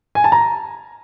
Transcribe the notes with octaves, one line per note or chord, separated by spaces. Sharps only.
G#5
A5
A#5